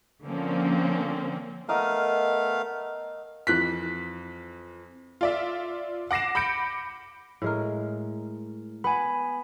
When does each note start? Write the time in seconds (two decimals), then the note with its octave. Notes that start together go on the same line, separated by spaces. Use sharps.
0.24 D3 F3 A#3 C4 C#4
1.69 A3 B3 A#4 D#5 F5
3.47 F2 E3 F#6 B6
5.21 F4 D5 E5
6.11 F#5 D6 A#6 C7 E7
6.35 B5 D6 G6 C#7 D7
7.42 A2 G#3 A#4
8.84 B3 G#5 B5